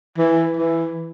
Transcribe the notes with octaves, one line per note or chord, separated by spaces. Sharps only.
E3
E3